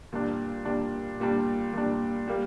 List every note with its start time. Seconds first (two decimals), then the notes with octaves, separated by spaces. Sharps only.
0.13 A#2 G3 D4
0.65 A#2 G3 D4
1.20 A#2 G3 D4
1.73 A#2 G3 D4
2.28 G3 A#3